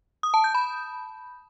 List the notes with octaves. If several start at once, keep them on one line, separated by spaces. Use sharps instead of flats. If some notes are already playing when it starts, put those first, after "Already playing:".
D#6
A5
G6
B5